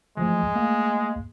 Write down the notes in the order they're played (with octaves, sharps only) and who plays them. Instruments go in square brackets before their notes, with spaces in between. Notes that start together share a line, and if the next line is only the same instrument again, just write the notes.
[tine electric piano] E3 F3 A3 [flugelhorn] G#3
[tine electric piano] A3 A#3 F5